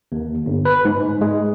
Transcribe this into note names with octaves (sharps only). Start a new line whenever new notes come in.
D#2
G1
B4
G#2
G#3